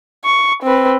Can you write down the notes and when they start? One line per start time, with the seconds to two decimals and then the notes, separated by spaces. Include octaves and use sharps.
0.24 C#6
0.63 C4 B4